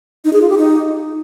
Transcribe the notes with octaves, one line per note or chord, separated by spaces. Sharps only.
D#4
G#4
F4
G4
D#4